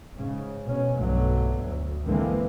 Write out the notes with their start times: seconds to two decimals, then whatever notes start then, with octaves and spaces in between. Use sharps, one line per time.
0.16 G#2 C#3
0.63 B2 C#4
0.95 B1 G2 B2 D3 F#3 A3
1.62 D2
2.05 G#1 D3 E3 G#3 A#3 C4